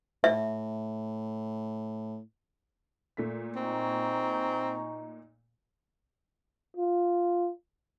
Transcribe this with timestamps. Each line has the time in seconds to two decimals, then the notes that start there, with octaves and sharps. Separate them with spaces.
0.24 A2 E5
3.17 A#2 A3 B6
3.56 C4 D#4 G#5 A#5 C#6
6.77 F4